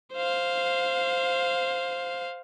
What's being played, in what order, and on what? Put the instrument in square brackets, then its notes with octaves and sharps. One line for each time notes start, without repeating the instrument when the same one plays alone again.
[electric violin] C5 F5